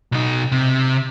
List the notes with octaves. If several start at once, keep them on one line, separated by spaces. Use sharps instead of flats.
B1 D#4
C3